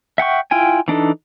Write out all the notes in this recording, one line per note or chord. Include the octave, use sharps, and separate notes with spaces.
E5 F#5 G5 C#6
E4 F4 G5 G#5
E3 D4 D#4 A4